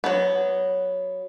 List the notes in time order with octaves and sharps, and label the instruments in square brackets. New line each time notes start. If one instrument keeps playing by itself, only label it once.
[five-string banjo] F#3 B3